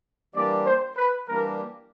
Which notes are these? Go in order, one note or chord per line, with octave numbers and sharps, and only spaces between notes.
E3 G3 A#3 D4 G4 D5
C5
B4
E3 G3 A#3 D4 G4 A#4